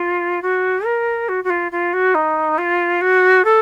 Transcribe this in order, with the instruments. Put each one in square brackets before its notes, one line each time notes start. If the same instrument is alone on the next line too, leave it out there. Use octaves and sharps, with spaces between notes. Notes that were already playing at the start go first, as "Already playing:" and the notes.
Already playing: [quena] F4
F#4
A#4
F#4
F#4
F4
F4
F#4
D#4
F4
F#4
A4